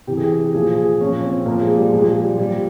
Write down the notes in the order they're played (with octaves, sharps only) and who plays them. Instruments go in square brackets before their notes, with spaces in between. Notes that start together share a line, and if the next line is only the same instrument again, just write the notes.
[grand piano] C3 E3 G4
G#4
G4
A#2 F3 G#4
G#4
A#2 F3 C#4
C4
A#2 F3 A#3
G#3
G3
A#2 F3 G#3
G#3
G3
A#2 F3 G3